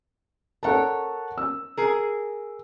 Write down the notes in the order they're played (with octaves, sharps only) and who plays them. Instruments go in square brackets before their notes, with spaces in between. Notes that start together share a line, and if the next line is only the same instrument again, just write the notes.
[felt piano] A4 F#5 A5 [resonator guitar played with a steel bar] A#4 C#5
[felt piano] E6
[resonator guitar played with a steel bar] G#4 A#4